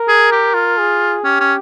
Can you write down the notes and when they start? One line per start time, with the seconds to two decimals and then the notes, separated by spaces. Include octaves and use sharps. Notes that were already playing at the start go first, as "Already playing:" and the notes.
Already playing: A#4
0.08 G#4
0.32 G4
0.54 F4
0.78 G#4
1.24 C#4 G4
1.40 C#4